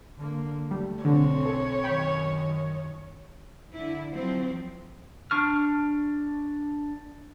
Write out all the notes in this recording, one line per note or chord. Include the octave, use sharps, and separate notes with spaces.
D3 A#3
G3 A3
B1 D3 C4 C#5
A4
F#2 D#3 G5 B5
D3 E4
F3 F#3 C4
D4 C#6 F6